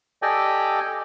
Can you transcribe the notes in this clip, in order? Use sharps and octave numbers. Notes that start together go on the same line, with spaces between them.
G4 A4 D5 D#5 G5 G#5